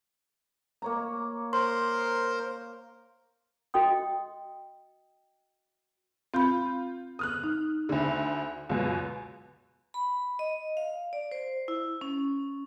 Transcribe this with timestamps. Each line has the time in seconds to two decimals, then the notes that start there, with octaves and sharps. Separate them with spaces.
0.82 A#3 C#5 A#5
1.53 A#4 C5 C6
3.74 F#4 D#5 G5 D#6
6.34 C4 F4 B5 G6
7.19 D#6 F6 F#6
7.44 D#4
7.89 D2 D3
8.69 C#2 F#2 B2
9.94 B5
10.39 D#5
10.77 F5
11.13 D5
11.32 C5
11.68 E4
12.01 C#4